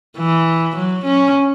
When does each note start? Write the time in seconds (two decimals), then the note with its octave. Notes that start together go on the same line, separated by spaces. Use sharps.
0.18 E3
0.76 F#3
1.05 C#4